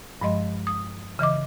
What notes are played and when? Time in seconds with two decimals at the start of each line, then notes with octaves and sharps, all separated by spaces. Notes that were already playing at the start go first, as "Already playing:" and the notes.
0.21 G2 F3 G#3 D#5 C6
0.67 D#6
1.19 C#3 E3 D#5 D6